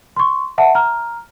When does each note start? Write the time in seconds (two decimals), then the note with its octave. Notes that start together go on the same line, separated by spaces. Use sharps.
0.17 C6 C#6
0.58 E5 F#5 A5
0.75 A#5 F6